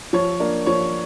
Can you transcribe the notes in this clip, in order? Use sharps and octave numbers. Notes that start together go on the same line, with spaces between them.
F3 C#5
A#3 D4
F3 C#5